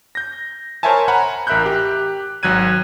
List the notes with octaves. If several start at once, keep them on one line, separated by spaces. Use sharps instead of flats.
G6 A#6
A#4 C5 C#5 E5 G#5 A5
F#5 G#5 A#5 B5
A1 A#4 E5 B5 F#6 G6
G4
G#1 F#3 F#6 G#6 D#7